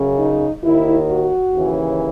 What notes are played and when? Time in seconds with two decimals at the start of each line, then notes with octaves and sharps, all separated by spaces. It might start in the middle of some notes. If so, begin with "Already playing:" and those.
Already playing: F#2 C#3
0.19 D#4
0.64 D#2 D#3 E4
1.09 F#4
1.53 D#2 C#3 E3